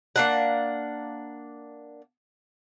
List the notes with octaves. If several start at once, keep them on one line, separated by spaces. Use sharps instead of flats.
A#3 D4 F#5